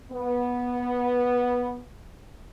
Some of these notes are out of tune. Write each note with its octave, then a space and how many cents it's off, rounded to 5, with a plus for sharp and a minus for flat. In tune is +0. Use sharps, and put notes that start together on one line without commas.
B3 -10